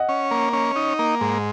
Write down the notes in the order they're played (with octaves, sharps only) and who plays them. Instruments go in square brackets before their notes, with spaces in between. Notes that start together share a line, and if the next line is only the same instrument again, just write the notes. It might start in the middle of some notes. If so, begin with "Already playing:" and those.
Already playing: [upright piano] D#5 F#5
[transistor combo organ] C#4
A#3
C#4
D#4
A#3
G#2